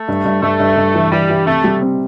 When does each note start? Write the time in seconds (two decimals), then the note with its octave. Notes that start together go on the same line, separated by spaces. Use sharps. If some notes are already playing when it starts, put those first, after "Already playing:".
Already playing: A3
0.08 G2
0.25 G2
0.42 G2 A3
0.60 G2
0.77 G2
0.94 E3
1.11 E3 G3
1.29 E3
1.46 C3 A3
1.64 G3
1.81 C4